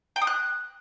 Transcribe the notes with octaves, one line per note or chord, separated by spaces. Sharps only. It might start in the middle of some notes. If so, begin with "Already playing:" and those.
G5
D#6
F#6